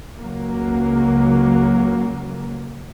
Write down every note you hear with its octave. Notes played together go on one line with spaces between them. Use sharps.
C#2 F#3 A#3